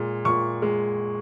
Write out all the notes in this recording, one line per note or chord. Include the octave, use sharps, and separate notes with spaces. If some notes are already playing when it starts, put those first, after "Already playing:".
Already playing: A#2 G#3
A#2 C#6
G#3